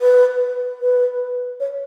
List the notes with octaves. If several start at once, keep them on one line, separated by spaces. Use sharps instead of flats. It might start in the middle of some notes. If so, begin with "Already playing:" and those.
B4
B4
C#5